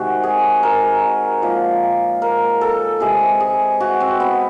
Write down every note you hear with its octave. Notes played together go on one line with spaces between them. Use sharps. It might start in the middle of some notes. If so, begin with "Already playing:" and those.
Already playing: C3 D#3 G#3 F#4
G#4
A#4
A#2 F3 G#3
A#4
A4
C3 E3 G#3 G#4
G#4
F#4
C4
B3